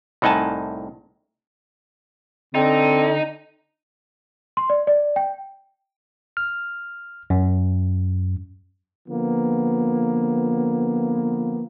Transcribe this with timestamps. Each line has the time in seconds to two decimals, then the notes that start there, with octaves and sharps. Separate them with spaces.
0.22 C2 A2 D#4 F#5 G#5 A5
2.55 D3 C4 D#4
4.57 C6
4.70 D5
4.87 D5
5.16 G5
6.37 F6
7.30 F#2
9.08 D3 F3 A#3 B3